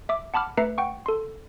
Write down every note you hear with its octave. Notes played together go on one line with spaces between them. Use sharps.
E5 D6
F#5 A5 B5 D6 F6
A3 B4 E5 A#5 C7 C#7
F#5 G5 C#6
A4 C6